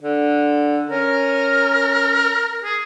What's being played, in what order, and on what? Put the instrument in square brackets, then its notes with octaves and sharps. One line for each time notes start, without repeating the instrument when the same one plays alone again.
[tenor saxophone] D3
[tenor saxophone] C#4 [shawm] A#4
[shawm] G#4